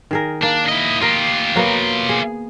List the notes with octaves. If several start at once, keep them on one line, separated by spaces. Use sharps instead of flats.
D#3 G#4 A#4
A#3 D4
E4 D#5
F4 G4 A#4 D#5
F#3 A#3 B3
G#4